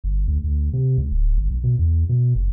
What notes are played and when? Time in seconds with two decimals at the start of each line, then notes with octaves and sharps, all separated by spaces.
0.04 G1
0.28 D2
0.44 D2
0.73 C3
0.98 C#2
1.11 D1
1.38 G1
1.50 B1
1.64 B2
1.79 E2
2.09 B2
2.35 F#1